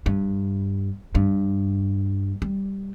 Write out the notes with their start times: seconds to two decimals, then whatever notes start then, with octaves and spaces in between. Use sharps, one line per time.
0.06 G2
1.15 G2
2.42 G3